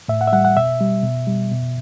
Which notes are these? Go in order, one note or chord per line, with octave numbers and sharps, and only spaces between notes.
A2 E5
F#5
E5
G3 F#5
F#5
B2 E5
G3
B2
G3
B2